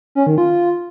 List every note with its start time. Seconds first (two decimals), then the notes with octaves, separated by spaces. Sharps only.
0.15 C#4
0.27 D#3
0.38 F4